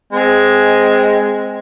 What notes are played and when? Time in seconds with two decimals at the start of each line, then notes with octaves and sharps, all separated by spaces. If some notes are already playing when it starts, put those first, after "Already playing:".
0.12 G#3 C4